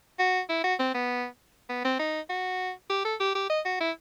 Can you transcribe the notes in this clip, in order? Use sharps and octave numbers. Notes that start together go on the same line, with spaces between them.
F#4
E4
F#4
C4
B3
B3
C4
D#4
F#4
G4
A4
G4
G4
D#5
F#4
E4